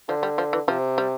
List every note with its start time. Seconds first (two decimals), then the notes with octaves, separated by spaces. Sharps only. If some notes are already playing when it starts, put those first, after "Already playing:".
0.08 D3 F3
0.23 G3
0.38 F3
0.53 E3
0.68 C3 F3
0.98 G3